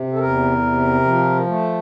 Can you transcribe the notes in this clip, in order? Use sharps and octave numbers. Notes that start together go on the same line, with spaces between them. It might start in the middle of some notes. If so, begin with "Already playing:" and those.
Already playing: C3
A4
E2 A#4
C3
F3
A3